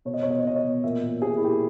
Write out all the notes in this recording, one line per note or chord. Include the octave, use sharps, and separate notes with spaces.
B2 C#5
D#5
B2 C#5
D#5
C#5
B2 D#5
C#5
B2
A#2 E5
A#2
A#2 G#4
G4
E4
A#2 G4